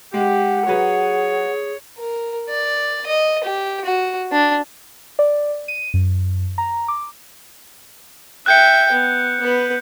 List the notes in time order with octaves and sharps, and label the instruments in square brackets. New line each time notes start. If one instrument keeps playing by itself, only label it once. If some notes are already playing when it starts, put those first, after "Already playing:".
[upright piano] G#3 [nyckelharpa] G4 [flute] F#5
[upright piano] F#3 B4 [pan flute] G#4 [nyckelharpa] C#5
[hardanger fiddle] A#4
D5
D#5
G4
F#4
D4
[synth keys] D5
D#7
F#2
A#5
D6
[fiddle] E5 G5 [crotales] F#6 G6 C#7
[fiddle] B3
B3 B4